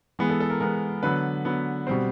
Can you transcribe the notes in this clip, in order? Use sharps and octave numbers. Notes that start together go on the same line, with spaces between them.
E3 G#3 B3 G#4
A4
A4
A#4
E3 G#3 B3 A#4
D3 F#3 B3 B4
D3 F#3 B3
B2 G3 C4 C5